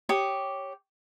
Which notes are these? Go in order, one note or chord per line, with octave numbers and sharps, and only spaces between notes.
G4 C#5 D6 D#6